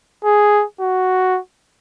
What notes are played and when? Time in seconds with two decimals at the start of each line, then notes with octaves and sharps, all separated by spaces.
0.24 G#4
0.80 F#4